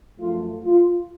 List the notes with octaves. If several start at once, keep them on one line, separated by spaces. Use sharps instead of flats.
F#2 F3 A3 F4
F4